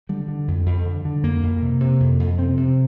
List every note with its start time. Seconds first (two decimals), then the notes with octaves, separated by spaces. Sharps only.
0.09 D3 G3
0.28 D3
0.48 F2
0.66 F2
0.85 D3
1.05 D3
1.23 F2 A#3
1.42 F2
1.61 C3
1.80 C3
2.00 F2
2.20 F2
2.38 C3 C4
2.57 C3